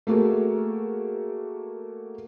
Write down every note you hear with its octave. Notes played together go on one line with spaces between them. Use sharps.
A3 A#3 F#4 G#4 A#4